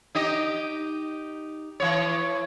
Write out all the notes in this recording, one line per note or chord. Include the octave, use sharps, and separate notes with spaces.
D#4 G4 D#5
E3 C#5